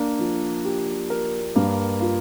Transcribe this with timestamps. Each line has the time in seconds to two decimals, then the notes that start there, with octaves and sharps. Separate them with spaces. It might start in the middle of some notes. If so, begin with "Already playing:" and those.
Already playing: A#3 D4
0.19 F3
0.65 G4
1.10 A#4
1.56 G2 A#3
2.01 F4